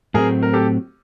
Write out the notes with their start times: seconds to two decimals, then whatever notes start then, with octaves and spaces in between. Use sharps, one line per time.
0.14 A2 F#3 A3 C4 G#4 A#4
0.43 A#4
0.53 G4 A4